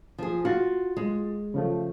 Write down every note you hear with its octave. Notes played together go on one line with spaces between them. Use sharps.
F3 G#4
F4 F#4 C6 A6
G#3
C#3 F3 A3